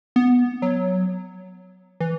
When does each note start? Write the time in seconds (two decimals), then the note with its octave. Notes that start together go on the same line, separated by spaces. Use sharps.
0.16 B3
0.62 F#3
2.00 E3